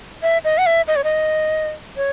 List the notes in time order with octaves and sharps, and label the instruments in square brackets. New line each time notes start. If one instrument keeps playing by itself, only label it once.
[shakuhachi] E5
D#5
F#5
E5
D#5
C#5
D#5
C#5